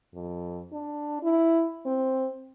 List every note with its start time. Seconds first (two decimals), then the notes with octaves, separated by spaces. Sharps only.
0.14 F2
0.72 D4
1.23 E4
1.86 C4